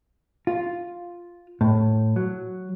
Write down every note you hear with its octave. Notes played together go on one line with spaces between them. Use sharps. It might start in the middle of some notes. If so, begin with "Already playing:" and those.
F4
A2
F#3